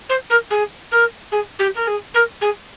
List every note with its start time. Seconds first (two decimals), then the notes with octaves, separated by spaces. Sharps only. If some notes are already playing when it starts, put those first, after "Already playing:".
0.09 C5
0.29 A#4
0.50 G#4
0.91 A#4
1.31 G#4
1.58 G4
1.75 A#4
1.86 G#4
2.14 A#4
2.41 G#4